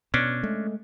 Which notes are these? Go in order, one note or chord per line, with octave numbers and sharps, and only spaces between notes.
B2 C#4 D4
G#3 A3